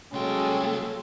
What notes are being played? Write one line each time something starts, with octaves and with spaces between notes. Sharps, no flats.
C2 F#3 G#3 A#3 C#4 A4 G5